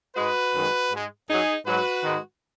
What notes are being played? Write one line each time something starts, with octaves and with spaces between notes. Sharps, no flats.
G#2 G#3 F#4 B4
F#2 D#3 G#3
G#2 G#3
F#2 F#3 D#4 G#4
G#2 F#3 F#4 B4
G#2 D#3 G#3